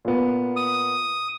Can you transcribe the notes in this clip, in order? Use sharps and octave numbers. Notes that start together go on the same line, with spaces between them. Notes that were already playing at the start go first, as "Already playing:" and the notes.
A#2 B3
D#6